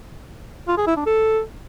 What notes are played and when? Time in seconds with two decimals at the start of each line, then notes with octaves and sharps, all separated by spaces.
0.68 F4
0.78 G#4
0.87 E4
0.97 D4
1.06 A4